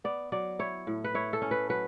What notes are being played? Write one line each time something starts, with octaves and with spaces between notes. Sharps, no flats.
B3 D5
F#3 D5
E4 C#5
A2
B4
E4 C#5
A4
C#4
B4
F#3 B4